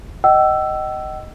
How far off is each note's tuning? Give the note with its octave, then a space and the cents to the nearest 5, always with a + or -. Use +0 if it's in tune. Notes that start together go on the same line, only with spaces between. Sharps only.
D#5 +0 G5 -45 E6 +10